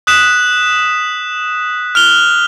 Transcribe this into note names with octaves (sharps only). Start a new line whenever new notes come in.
D#6 F#6 B6 E7
F6 F7 G7